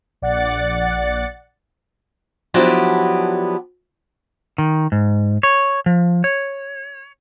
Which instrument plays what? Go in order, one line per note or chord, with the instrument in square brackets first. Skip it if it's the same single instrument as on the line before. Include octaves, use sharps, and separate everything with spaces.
[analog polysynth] A#1 D5 F#5 F#6 A6 C#7
[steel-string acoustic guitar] F3 F#3 B3 D4 E4 G4
[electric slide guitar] D#3
G#2
C#5
F3
C#5